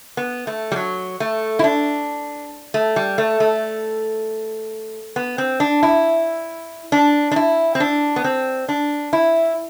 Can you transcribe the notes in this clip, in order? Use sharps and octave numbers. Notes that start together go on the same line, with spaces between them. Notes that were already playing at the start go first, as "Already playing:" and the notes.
B3
A3
G3
F#3
A3
E4
D4
A3
G3
A3
A3
B3
C4
D4
E4
D4
D4
E4
C4
D4
B3
C4
D4
E4